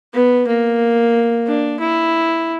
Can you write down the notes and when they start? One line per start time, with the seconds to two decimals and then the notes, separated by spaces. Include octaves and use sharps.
0.14 B3
0.47 A#3
1.46 D4
1.80 E4